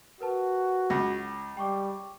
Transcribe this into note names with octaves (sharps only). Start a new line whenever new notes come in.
F#4 A#4 B4 A5
C#2 A#6
G3 G5 C#6 D6